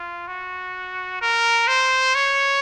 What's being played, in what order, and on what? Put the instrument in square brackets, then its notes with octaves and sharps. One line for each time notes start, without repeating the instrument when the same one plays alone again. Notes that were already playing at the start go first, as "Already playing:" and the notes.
Already playing: [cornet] F4
F#4
A#4
C5
C#5